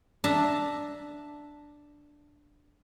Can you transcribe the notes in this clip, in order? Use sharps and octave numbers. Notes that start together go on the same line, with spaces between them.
D4 E5 A5 A#5